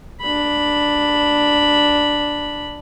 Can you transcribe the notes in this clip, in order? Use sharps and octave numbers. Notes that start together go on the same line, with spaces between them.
D4 B5